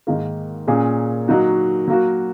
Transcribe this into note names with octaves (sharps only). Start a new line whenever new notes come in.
G#2 D#3 A#3
A#2 A#3 C#4 G#4
F#3 A#3 D#4 F#4
F#3 A#3 F#4